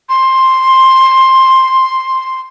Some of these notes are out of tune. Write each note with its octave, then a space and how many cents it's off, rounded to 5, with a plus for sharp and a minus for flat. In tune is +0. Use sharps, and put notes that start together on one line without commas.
C6 +5